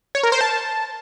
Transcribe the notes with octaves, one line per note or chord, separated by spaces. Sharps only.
C#5
A#4
C5
A5